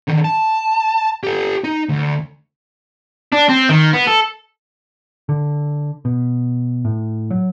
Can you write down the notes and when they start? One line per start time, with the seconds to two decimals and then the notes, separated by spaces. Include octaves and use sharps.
0.08 D3 D#3
0.24 A5
1.23 G4 A4
1.64 D#4
1.89 D2
3.33 D4
3.49 C4
3.70 D#3
3.94 B3
4.08 A4
5.29 D3
6.05 B2
6.85 A2
7.30 F#3